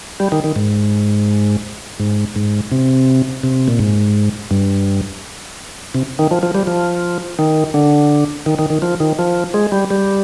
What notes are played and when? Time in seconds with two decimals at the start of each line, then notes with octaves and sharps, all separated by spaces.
0.20 G3
0.32 D#3
0.44 D#3
0.56 G#2
2.00 G#2
2.36 G#2
2.72 C3
3.43 C3
3.68 A#2
3.79 G#2
4.51 G2
5.95 C3
6.19 D#3
6.31 F3
6.43 F3
6.55 G3
6.67 F3
7.39 D#3
7.74 D3
8.46 D#3
8.59 D#3
8.70 D#3
8.82 F3
9.00 D#3
9.19 F3
9.54 G#3
9.72 G3
9.90 G3